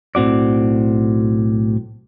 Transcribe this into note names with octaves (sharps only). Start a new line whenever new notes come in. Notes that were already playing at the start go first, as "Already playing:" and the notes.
B1 A2 C4 F#4 D5